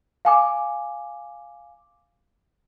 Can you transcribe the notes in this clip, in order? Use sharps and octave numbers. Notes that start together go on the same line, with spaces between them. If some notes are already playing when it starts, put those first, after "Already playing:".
F5 G#5 D6